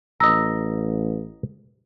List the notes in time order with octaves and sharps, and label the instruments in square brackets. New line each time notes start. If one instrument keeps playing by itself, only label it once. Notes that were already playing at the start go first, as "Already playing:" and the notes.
[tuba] A1 [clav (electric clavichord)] D#5 A#5 [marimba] E6